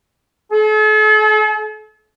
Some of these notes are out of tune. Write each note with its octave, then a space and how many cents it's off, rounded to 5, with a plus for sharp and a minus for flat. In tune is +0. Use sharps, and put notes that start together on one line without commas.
A4 -45